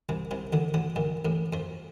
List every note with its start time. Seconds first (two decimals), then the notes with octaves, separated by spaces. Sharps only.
0.09 C2 C3
0.31 C2 C3
0.53 D2 D3
0.74 D2 D3
0.96 A#1 A#2
1.25 A1 A2
1.53 F2 F3